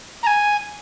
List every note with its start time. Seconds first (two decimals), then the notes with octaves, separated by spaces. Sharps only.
0.23 A#5
0.27 G#5